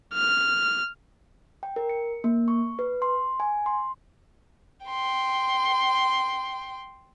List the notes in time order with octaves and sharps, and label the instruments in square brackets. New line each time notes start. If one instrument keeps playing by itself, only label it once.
[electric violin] F6
[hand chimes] G5
A#4
C#7
A#3
C#6
B4
C6
G#5
C6
[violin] G5 C6